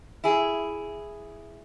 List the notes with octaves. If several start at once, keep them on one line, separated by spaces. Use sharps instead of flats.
E4 G#4